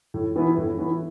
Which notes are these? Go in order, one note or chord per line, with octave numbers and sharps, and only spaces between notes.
A2
E3 B3 E4 B4
A2
E3 B3 E4 B4